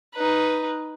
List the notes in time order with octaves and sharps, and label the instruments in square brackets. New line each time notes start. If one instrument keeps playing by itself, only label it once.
[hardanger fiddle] D#4 B4